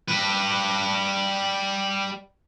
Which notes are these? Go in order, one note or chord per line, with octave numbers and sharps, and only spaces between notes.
G3 B4